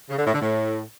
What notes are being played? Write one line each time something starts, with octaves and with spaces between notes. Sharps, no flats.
C#3
D3
A2
D3
A2